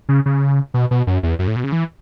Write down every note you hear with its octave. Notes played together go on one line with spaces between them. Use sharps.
C#3
C#3
B2
B2
F#2
E2
F#2
A2
B2
C#3
E3